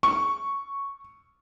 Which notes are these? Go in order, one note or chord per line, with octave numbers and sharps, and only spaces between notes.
C#6